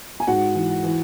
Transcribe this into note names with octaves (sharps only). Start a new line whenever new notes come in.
G#5
G#2 F#4 F#5
E3
E3